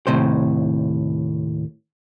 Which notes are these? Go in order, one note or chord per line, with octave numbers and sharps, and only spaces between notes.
D#2 A2 C3 C5